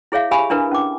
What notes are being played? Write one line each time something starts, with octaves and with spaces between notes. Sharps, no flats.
E4 G#4 C#5 E5 F5
G4 F5 G#5 B5 D#6
D4 E4 A#4 B4
C#4 D6